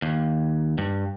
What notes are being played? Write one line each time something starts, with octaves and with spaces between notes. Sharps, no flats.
D#2
G2